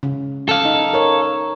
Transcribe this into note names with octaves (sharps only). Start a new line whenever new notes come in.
C#3
A4 F5
D#4
A#4 C#5